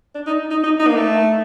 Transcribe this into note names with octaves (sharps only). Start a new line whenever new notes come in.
D4
D#4
D#4
D#4
D#4
A#3
A3